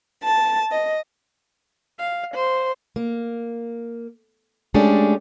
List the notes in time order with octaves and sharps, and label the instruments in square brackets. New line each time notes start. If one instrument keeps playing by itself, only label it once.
[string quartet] A5
D#5
[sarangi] F5
C5
[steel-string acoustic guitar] A#3
G#3 A3 C#4 D4 G4